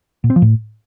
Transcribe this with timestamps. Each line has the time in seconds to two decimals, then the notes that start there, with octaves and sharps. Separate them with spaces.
0.24 A#2
0.30 C4
0.36 F3
0.42 A2